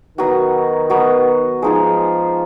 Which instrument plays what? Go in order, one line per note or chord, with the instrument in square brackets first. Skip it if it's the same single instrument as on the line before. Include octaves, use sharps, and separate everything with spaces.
[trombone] D#3 [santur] F#3 B3 F#4
[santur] F#3 B3 F#4
[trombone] F3 [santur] G#3 D#4 G#4